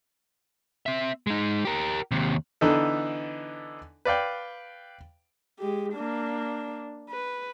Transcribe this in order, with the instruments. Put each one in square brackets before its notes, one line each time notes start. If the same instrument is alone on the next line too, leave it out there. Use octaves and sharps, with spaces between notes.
[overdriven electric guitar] C4 E5
G#3 D#4
G4 A#4
D#2 C3
[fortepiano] D3 E3 B3 D4 D#4 A4
B4 D5 F5 G5
[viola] G#3 G4
A#3 D4
B4